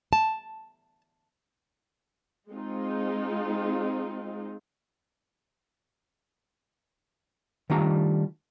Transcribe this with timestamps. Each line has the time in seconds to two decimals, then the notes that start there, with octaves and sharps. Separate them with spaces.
0.13 A5
2.51 G#3 C4 D#4 F4
7.70 D#3 G3 A3 D4 F4 A#5